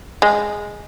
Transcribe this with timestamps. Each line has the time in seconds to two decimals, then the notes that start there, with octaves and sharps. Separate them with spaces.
0.22 G#3